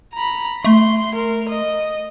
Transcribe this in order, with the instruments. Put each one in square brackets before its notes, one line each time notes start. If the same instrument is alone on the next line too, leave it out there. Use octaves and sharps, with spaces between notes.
[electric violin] A#5 B5
[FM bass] A3 [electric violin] C6
[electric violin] A#4
D#5